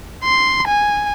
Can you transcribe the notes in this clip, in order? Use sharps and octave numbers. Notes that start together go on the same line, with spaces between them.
C6
G#5